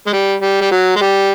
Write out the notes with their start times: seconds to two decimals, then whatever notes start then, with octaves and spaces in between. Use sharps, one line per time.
0.07 G#3
0.13 G3
0.42 G3
0.61 G3
0.72 F#3
0.96 G#3
1.01 G3